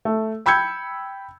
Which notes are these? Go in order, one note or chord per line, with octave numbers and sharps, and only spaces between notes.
A3
G5 B5 E6 G6 G#6 C#7